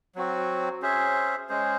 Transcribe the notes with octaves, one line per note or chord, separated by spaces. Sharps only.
F#3 C4 F#4
C#4 G#4 C5 E5
G#3 C#4 G#4 C5